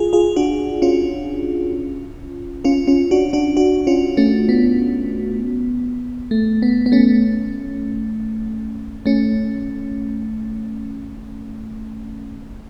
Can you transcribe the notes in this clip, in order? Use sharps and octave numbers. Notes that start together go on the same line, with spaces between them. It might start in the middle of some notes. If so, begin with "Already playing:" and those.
Already playing: F4 G#4
F4 G#4
D4 F#4
C#4 F4
C#4 F4
C#4 F4
D4 F#4
D4 F#4
D4 F#4
C#4 F4
A3 C#4
B3
A3
B3
B3
A3 C#4
A3 C#4